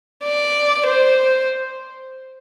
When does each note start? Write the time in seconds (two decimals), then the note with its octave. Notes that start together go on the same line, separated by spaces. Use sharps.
0.24 D5
0.87 C5